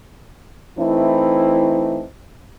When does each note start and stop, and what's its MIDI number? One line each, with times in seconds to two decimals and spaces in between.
0.78 2.03 52
0.78 2.03 57
0.78 2.03 60
0.78 2.03 63
0.78 2.03 64